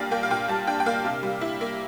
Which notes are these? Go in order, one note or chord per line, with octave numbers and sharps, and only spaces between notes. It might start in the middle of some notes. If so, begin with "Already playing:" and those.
Already playing: A#2 G3 D4 F5 G5 A5
A#3 G5
F5
A#2 G5
G3 A5
D4 G5
G5
A#3 F5
C3
G3
E4
A#3